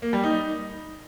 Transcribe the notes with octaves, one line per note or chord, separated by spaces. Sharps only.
A#3
G3
D#4